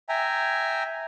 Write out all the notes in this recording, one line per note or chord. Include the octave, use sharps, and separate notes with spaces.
E5 G5 G#5 A#5